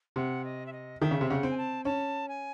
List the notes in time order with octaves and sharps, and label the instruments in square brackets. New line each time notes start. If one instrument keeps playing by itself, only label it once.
[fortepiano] C3 [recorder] F#5
[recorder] D#5
E5
D#5
[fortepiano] D#3 [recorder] E5
[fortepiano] C#3
C3
[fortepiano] C#3 [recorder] F#5
[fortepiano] C4
[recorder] G#5
A5
[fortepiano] C#4 [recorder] A5
[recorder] G#5